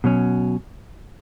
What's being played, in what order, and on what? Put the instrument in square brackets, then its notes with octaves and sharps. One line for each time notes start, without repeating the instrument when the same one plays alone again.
[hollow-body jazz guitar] B2 F#3 C#4